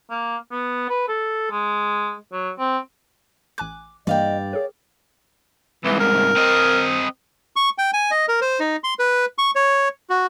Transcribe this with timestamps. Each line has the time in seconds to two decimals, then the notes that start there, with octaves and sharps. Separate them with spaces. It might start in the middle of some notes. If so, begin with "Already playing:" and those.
0.10 A#3
0.52 B3
0.89 B4
1.08 A4
1.51 G#3
2.32 F#3
2.59 C4
3.58 A1 G#5 D6 F#6
4.07 G2 E3 A#3 D5 D#5 F5 G5
4.53 G#4 A#4 C#5
5.85 C2 G#2 E3
6.00 A#4
6.37 C4 D#5
7.56 C#6
7.78 G5
7.93 G#5
8.11 D#5
8.28 A#4
8.41 C5
8.60 D#4
8.84 C6
8.99 B4
9.38 C#6
9.55 C#5
10.10 F#4